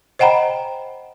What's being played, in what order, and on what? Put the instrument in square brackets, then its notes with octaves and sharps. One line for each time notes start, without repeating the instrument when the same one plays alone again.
[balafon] C5 D#5 F#5 G5 A#5 B5